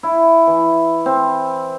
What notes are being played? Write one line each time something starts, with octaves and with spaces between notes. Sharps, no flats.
E4
E3
C4